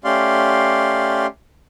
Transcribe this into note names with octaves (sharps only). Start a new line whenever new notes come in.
A3 C#4 G4 D5 F5 C6